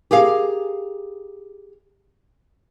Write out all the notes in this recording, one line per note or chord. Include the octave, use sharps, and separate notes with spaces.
G4 G#4 A#4 F5